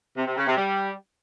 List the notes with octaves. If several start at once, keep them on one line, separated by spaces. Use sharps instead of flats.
C3
C3
C#3
C3
G3